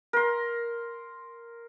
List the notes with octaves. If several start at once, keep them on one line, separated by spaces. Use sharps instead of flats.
A#4 C6